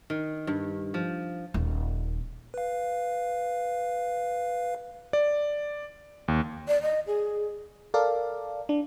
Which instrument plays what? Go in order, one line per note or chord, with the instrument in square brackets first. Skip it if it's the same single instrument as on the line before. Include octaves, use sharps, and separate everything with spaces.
[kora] D#3
G2
F3
[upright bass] D#1 D#3
[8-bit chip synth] B4 F5
[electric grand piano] D5
D#2
[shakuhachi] D5
D#5
G#4
[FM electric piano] A4 A#4 D5 F5
D4